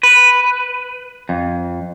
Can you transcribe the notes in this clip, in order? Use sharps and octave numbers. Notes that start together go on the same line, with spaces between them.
B4
F2